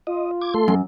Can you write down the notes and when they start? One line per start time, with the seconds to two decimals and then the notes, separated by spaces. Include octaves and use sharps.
0.07 F4 D#5
0.42 D6 G#6
0.54 A3 A4 C6
0.68 F#2